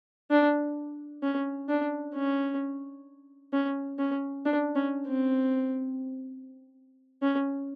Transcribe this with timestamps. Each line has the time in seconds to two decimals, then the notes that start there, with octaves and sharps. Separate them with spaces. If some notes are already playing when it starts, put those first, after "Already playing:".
0.31 D4
1.23 C#4
1.69 D4
2.14 C#4
3.53 C#4
3.99 C#4
4.46 D4
4.76 C#4
5.07 C4
7.22 C#4